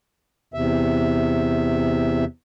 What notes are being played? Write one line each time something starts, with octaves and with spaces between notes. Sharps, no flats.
E2 C3 E5